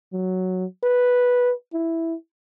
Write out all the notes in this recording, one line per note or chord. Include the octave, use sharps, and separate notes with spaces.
F#3
B4
E4